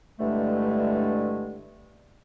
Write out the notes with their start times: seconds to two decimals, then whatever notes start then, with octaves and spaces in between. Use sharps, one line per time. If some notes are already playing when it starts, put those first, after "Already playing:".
0.20 G2 D3 E3 G#3 A3